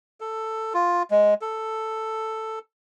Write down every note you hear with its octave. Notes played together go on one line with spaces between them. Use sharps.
A4
F4
G#3
A4